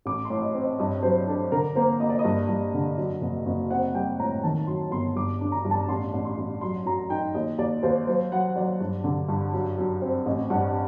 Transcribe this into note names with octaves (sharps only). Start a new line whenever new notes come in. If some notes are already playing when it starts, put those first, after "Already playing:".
A1 D6
C6
A2
D#5
C4
D#5
G2 D#5
F#3 C5
D4 A4
D3 A#4
A#3 C5
A#3 D#5
D5
D#5
G2
G2
D3
F#2
F#1
F#1
C4 F#5
G3 G5
A2 A#5
D#3 A5
F#2 C6
G1 C6
G2 D6
D4
A#5
G2
A5
A1 C6
A1
C6
A1
F#3 C6
F#2 A#5
D#4 G5
D#2 D#5
D#2 D5
D#2 C5
F#3 C5
F#3 F#5
F#3 D5
G2
D3
G2
F#2
F#2
C4
A1 D#5
G2 F#5